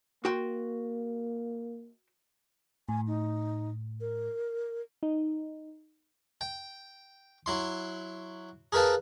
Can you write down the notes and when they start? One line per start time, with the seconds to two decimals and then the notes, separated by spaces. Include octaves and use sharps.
0.25 A#3 F#4 G5 C6
2.89 A2 G#5
3.07 D#4
4.01 A#4
5.03 D#4
6.41 G5
7.46 F#3 E4 C6
8.72 G#4 A#4 B4 F5 A5